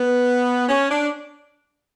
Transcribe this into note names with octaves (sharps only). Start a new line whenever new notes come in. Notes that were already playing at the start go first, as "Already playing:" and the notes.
Already playing: B3
C#4
D4